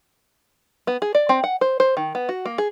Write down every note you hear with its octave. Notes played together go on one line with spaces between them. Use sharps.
B3
G#4
D5
C4
F#5
C5
C5
D#3
B3
F#4
A#3
G#4